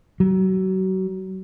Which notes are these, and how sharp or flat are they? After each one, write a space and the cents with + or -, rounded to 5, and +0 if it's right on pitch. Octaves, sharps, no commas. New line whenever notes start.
F#3 +30